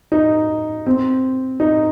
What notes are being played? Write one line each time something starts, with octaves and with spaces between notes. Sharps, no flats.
D#4
C4
D#4